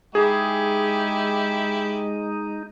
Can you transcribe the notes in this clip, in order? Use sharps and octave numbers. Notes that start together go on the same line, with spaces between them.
G#3 D#4 E4 G4 G#4